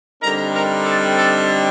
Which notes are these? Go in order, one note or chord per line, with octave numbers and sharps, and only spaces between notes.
D3 G3 C4 D#4 A#4 A#5
A#4 A#5
A4 A5
A4 A5